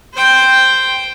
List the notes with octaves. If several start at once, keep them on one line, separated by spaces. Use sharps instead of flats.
C5 G5